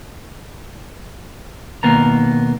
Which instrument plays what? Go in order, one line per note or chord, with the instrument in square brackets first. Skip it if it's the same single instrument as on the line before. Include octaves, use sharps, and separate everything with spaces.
[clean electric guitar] B1 G#2 D#3 A#3 B3 A#5